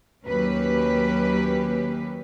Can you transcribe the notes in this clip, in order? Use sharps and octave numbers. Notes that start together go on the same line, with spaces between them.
D#2 F#3 A#3 C#4 G4 B4